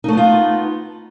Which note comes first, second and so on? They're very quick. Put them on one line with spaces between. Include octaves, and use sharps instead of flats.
D#4 A3 B3 F4